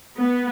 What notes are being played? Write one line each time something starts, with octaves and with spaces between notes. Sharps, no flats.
B3